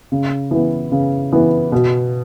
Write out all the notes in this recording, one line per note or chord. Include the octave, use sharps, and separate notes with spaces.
C#3
E3 B3
C#3
E3 B3
B2